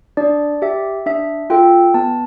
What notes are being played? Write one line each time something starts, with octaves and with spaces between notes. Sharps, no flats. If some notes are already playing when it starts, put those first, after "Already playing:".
D4 D5
G4 E5
D4 E5
F4 A4 G5
B3 A5